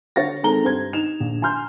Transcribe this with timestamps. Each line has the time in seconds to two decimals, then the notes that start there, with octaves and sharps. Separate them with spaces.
0.16 D3 C#5 A6 A#6
0.43 D#3 G#3 C4 A4 A#5 G7
0.63 G2 C5 G#6
0.93 D#4 E7 F7
1.20 A#1
1.42 G#5 A#5 C6 F6 G6